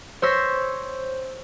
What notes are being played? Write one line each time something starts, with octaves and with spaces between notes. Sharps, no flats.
C5 C#5 E6 A#6 B6